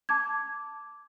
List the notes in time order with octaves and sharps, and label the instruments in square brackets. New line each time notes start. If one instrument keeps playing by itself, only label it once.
[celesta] A5 D6 G#6